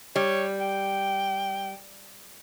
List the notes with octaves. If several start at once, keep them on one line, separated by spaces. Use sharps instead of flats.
G3 C#5
G5